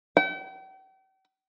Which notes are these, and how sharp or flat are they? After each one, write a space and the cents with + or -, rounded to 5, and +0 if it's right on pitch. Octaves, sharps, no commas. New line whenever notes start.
G5 -40